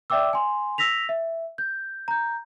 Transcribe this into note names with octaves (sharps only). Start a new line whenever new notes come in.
D5 E5 G5 D6 E6
G#5 C6
E6 A#6 B6 F7
E5
G6
A#5 G6